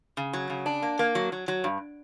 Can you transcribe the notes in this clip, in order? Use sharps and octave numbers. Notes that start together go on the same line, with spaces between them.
C#3
F#3
C#3
D4
A#3
A#3
F#3
F#3
F#3
G2